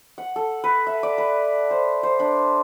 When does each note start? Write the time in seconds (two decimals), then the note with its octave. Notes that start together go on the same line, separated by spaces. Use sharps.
0.18 F#5
0.36 A4
0.64 B4
0.87 E5
1.03 D5
1.18 B4
1.71 C5
2.03 C5
2.20 D4